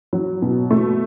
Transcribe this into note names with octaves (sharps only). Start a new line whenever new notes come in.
F#3
B2
A3